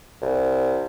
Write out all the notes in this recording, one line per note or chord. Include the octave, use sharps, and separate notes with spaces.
C2